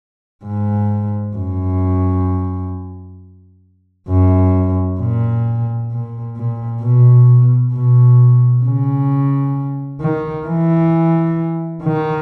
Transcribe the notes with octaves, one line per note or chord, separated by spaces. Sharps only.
G#2
F#2
F#2
A#2
A#2
A#2
B2
B2
C#3
D#3
E3
D#3